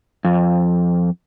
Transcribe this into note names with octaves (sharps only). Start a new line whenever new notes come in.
F2